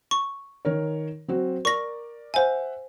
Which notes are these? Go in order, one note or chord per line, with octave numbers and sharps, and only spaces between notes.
C#6
D#3 A#4 C#5
F#3 C4 F#4
A#4 D5 C#6 A#6
C5 E5 F#5 G#5